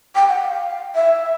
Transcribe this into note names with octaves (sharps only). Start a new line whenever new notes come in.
G5
F#5
F#5
F5
E5